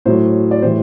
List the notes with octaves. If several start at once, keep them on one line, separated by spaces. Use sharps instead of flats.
A2 F#3 C5
D5
A2 E3 G3 C5